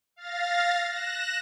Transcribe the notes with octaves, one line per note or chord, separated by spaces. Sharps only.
F5 A6 A#6
F#6 A#6 E7